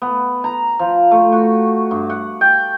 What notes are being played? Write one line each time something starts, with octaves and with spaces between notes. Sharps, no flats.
B3
A#5
F3
A3
F#4
G2
F#5
G5